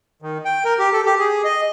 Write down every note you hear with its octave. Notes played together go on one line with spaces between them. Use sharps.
D#3
G5
A#4
G4
A4
G4
G#4
D#5